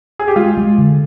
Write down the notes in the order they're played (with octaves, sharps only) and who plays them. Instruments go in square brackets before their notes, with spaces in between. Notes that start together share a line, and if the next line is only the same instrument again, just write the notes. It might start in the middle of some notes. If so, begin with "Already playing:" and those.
[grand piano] G#4
G4
[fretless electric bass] G#3 [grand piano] F4
[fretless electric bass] G#3
D3